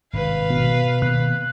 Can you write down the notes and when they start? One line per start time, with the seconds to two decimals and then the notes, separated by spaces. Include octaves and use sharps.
0.13 G#1 G2 C3 B4 F5
0.50 B2
1.02 B2 D#3 A#3 F#6